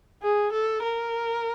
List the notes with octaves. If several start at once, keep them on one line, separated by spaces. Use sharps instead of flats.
G#4
A4
A#4